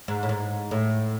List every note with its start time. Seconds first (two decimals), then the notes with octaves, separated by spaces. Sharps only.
0.08 G#2
0.23 A2
0.29 G#2
0.71 A2